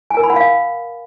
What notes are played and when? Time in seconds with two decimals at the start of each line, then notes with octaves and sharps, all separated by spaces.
0.10 G#5
0.17 A#4
0.23 B5
0.30 F#5
0.36 F5